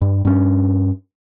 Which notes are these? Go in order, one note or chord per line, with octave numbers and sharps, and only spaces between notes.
G2
G2 C#4